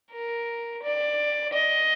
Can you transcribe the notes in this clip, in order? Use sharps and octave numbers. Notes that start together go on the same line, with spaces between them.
A#4
D5
D#5